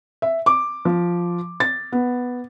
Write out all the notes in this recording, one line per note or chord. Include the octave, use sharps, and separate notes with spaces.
E5
D6
F3
A6
B3